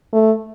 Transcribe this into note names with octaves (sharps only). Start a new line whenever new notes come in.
A3